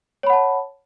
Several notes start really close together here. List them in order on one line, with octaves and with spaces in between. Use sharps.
C#5 B5 F#5 A5